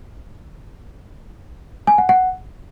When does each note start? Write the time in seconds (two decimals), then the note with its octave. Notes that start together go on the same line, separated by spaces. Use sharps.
1.87 G#5
1.98 F#5
2.09 F#5